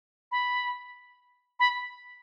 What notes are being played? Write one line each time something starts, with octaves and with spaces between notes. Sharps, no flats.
B5
B5